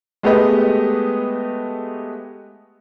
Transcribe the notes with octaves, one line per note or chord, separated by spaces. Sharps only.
G#3 A3 B3 G4 B4 D#5